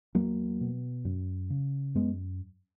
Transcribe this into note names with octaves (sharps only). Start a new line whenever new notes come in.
E2 F#3 A#3
B2
F#2
C#3
F#2 G#3 B3